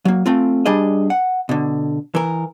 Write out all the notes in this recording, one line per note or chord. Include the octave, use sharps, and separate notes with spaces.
F#3 A#3
A3 C4 F4
G3 D4 G#4 D#5
F#5
B2 D3
E3 A#4